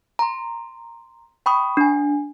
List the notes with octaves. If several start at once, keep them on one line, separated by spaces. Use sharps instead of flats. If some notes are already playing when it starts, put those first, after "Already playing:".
A#5 C6
G5 B5 C#6 D#6
D4 G#5